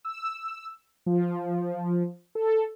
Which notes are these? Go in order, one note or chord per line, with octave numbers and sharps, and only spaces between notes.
E6
F3
A4